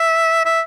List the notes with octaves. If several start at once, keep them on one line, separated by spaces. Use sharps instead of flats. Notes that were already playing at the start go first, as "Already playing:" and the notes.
Already playing: E5
E5